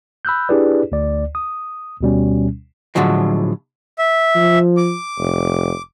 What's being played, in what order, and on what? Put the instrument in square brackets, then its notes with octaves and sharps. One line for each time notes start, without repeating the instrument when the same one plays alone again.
[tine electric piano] B5 E6 F#6 G6
D4 E4 G4 G#4 B4 D5
D2 D5
D#6
D2 B2 G3 C#4
[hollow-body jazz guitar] A2 D3 F3 F#3 G#3
[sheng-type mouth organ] E5
[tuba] F3
[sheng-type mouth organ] D6
[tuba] F1